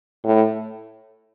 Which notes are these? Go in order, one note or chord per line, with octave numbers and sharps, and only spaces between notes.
A2